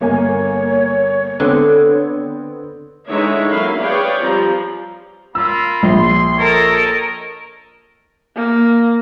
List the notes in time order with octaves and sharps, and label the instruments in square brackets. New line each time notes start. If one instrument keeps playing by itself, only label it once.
[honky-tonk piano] G1 A#3 G#5 [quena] C#5
[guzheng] D3 [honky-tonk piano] B3 C4
[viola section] D3 E3 G#3 D#4 C#5 E5
F#3 A#3 C#4 E5 F5 B5
G#4 B4 C#5 D5 F5 G5
F3 G3 C4 A#5
[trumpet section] A#3 F4 B5 [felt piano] E6
[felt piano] A#1 [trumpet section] C6
[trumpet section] A4 C#5 [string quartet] A#4 D#5
[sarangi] A#3